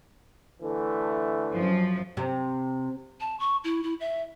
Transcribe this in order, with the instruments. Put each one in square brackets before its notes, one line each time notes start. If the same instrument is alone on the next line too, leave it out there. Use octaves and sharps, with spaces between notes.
[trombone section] D3 E3 A3
[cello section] F#2 F3
[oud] C3
[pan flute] A5
C#6
E4
E4
E5